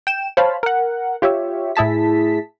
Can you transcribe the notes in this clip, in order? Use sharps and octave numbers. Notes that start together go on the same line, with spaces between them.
G5 E7
C5 C#5 F5 A5 B5
A#4 F#5
F4 G4 C#5 E5
A2 E4 G#4 A5 B6